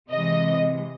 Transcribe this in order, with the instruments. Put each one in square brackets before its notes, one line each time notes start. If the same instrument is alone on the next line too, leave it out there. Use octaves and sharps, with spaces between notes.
[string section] C3 E3 G#3 D#5